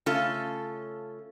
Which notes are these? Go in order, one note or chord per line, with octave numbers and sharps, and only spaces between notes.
C#3 A3 C#4 F4 A4